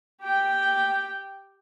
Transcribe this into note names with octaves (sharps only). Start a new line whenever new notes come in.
G4 G5